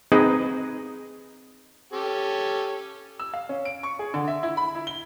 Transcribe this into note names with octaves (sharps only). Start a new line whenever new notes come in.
C4 D#4 G#4 B4 D#5
C#4 G4 A4
E6
F5
C#4
D7
C#6
G#4
D3
E5
E4
B5
E4
G7